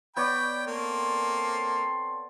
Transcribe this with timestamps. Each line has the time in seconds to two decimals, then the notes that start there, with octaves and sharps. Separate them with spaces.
0.16 B3 C#5 D5 G5 B5
0.67 A#3 C4 A4 C6